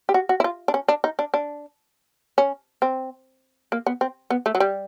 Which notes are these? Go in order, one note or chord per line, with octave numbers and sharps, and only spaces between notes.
G4
F#4
F#4
E4
F4
D4
C#4
D4
D#4
D4
D4
C#4
C4
A#3
B3
C4
B3
A3
F#3
G3